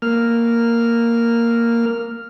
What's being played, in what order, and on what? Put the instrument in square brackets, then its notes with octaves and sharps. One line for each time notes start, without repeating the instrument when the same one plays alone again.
[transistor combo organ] A#3 F6